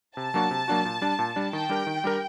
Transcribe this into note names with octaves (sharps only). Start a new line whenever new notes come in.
C3 A5
F#3 A#3 D4 F#4
C3
F#3 A#3 D4 F#4
A#2
G3 D4
A#2
G3 D4
D#3 G5
G3 D4 G4 A#4
D#3
G3 D4 G4 A#4